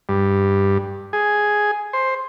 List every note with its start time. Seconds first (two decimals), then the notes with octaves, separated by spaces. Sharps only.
0.09 G2
1.13 G#4
1.93 C5